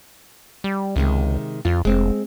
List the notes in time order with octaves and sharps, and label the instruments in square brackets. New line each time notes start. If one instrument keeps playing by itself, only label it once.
[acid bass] G3
[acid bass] C#2 [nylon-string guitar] C3 D#3 G#3
[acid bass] F2 [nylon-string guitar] F4
[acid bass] F1 [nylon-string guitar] G#3 C4